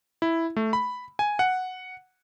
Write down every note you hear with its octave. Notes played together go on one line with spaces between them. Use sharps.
E4
A3
B5
G#5
F#5